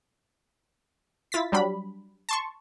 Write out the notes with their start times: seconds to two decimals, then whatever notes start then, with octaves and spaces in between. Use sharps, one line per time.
1.32 E4 F4 A6 B6
1.52 F#3 G3 D4 B5
2.29 A5 C6 C#6